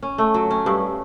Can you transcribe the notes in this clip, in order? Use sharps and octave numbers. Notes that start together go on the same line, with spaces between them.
C#4
A3
F#3
C#4
G2